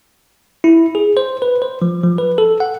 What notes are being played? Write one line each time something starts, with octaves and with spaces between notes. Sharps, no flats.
E4
G#4
C5
B4
C5
F3
F3
B4
A4
F#5